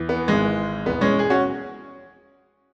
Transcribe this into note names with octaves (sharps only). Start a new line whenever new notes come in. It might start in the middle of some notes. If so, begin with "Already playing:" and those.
Already playing: E2 E3
B3
G#1 G#2 E3 G#3
E1 E2 E3 B3
G#3 C#4
G#4
C#4 F#4